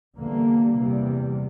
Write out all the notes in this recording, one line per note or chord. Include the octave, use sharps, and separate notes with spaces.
E2 D3 G3 A#3
E2 C3 G3